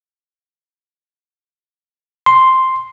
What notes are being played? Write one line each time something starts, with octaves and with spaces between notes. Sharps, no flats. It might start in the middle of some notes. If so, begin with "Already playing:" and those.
C6